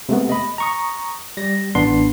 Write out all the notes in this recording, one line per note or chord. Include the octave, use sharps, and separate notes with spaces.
C3 G#3 A3 B3
D#5 B5
A#5 C#6 D#6
G3 A#6
A1 B3 D4 C6